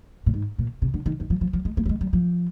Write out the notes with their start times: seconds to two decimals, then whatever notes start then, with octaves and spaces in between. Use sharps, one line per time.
0.26 A#2
0.34 G#2
0.58 A#2
0.82 C3
0.94 D3
1.06 D#3
1.20 D#3
1.30 F3
1.41 F3
1.53 F3
1.65 G#3
1.77 A#3
1.86 G3
1.89 G#3
2.01 G3
2.13 F3